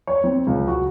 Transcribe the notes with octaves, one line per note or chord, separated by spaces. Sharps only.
C#5
C4
C#2
F#4